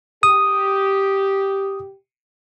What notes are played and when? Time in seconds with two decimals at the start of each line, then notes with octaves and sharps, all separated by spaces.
0.23 G4 D#6